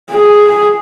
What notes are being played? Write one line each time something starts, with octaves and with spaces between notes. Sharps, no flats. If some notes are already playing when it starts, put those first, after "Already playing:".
G#4